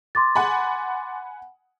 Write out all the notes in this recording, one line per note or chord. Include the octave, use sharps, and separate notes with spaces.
C6 D6 A6
F#5 G#5 B5